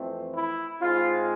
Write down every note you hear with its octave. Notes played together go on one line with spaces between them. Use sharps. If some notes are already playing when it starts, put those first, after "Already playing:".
Already playing: F2 E3 A3 C4
E4
G#2 G#3 C4 F4